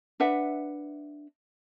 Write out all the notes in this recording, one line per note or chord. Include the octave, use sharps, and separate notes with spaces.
D4 B4 E5 F#5